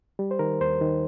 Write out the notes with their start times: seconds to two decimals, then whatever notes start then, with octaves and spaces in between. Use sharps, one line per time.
0.19 G3
0.31 C5
0.39 D#3 A#4
0.60 D#2 C5
0.81 D#3